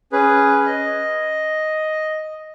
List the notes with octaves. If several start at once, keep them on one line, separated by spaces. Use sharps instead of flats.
C#4 G#4 B4
D#5